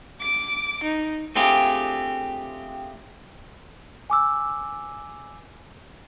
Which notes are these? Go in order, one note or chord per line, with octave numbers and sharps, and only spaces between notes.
D6 D7
D#4
A3 C4 D4 F4 G4 G#4
G#5 D6 E6